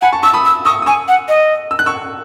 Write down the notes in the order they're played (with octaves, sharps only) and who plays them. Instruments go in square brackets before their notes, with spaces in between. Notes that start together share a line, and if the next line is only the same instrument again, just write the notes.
[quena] F#5 [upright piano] G#5 B5
[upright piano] A5 C#6
[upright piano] A5 C#6 [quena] E6
[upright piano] B5 D#6
[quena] E6
[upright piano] C#6 E6 [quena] D#6
[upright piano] D#6
[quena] G#5 [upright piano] C#6 E6
[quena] F#5
D#5
[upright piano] E6
F#6
C#6 E6